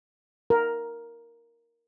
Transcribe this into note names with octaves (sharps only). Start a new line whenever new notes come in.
A#4